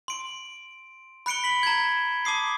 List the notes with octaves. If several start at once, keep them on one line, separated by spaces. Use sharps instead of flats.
C6 D7
B5 F#6 C#7 D7 G7
B6 F#7
A#5 G#6
A5 D6 D#6 C7